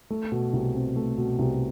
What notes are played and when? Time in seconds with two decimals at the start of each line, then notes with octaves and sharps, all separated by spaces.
0.10 A3
0.32 B2
0.53 C2
0.75 C4
0.96 A3
1.18 B2
1.39 C2